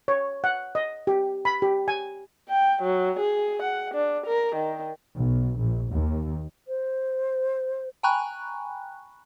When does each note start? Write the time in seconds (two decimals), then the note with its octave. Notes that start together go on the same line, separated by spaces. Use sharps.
0.08 C#5
0.44 F#5
0.75 D#5
1.07 G4
1.45 B5
1.62 G4
1.88 G#5
2.49 G5
2.83 F#3
3.19 G#4
3.62 F#5
3.94 D4
4.26 A#4
4.56 D#3
5.16 B1
5.58 A#1
5.91 D#2
6.67 C5
8.03 G5 G#5 A#5 B5 C#6 F#6